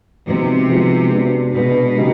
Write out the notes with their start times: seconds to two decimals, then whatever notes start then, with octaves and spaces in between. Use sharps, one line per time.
0.26 C3 F3 G#3 B3 D#4 F#4
0.69 F3 G#3 B3 D#4 F#4
1.11 G#3 B3 D4 F#4
1.53 B2 G#3 B3 D4 F#4
1.96 C#3 F#3 A#3 D#4 G4